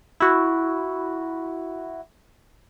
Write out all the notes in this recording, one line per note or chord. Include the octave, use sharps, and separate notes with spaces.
E4 F#4